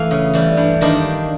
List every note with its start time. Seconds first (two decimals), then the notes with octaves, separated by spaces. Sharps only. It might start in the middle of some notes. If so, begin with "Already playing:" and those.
Already playing: E3 A3 F5
0.11 C#3
0.34 E3 G3
0.57 G2
0.81 D#3 G3 A#3 D4